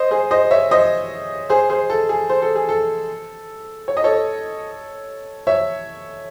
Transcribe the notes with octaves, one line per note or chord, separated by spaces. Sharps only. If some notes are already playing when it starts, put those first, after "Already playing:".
Already playing: C5 D#5
G#4 C5
C5 D#5
C#5 E5
C5 D#5
G#4 C5
G#4 C5
A4
G#4
C5
A4
G#4
A4
C#5
D#5
A4 C#5
C#5 E5